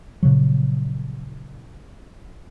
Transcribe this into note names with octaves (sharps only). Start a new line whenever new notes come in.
A#2 C#3 F3 F#3